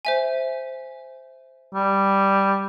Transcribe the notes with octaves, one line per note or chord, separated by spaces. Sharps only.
C5 E5 G#5
G3